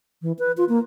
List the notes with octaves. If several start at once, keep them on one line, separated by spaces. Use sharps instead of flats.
E3
B4
F4
A#3